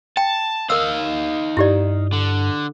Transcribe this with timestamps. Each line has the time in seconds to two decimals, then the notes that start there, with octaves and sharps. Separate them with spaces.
0.17 G5 A5
0.70 D#4 A#4 F5 D#6 E6
1.57 G2 E4 G4 D5
2.13 D3